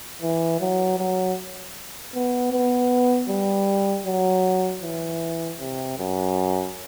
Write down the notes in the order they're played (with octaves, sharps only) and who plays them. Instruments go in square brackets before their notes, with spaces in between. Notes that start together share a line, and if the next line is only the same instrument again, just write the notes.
[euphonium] E3
F#3
F#3
B3
B3
G3
F#3
E3
C3
F#2